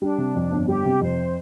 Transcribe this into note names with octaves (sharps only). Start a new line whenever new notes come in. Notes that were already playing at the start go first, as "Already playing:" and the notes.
G3 D4
C3
F2
G1
G3 G4
C3
F2 C5